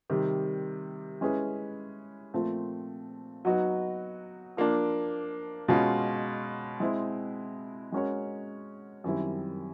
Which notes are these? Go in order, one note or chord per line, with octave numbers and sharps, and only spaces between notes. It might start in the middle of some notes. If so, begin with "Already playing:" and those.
C3 D#3 G3
G#3 C#4 E4 G#4 B4
A#2 F3 A3 C4
F#3 B3 D#4 F#4
F3 A#3 D4
B2 G#3 C#4 F4
G#3 C4 E4
G#3 C#4 F#4 A#4 C#5
F#2 D#3 G3 C4 E4